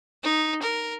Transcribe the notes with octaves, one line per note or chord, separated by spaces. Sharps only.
D#4
A#4